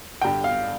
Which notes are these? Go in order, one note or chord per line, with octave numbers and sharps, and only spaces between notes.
G2 D3 G5
F5